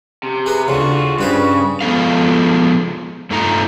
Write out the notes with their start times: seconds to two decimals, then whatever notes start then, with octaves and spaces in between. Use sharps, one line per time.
0.23 C3
0.46 G#4 B4 A#5
0.68 D2 C#3 F4 F#4
1.19 G2 C#3 B4 C5
1.81 F3 G#3 B3 A4 F5
3.31 G2 A3 D#4 F4 A#5